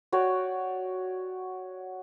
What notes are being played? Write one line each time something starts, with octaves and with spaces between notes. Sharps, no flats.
F#4 C#5 D5 G5